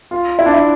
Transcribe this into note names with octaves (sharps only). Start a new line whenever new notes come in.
F4
E4
D4
E4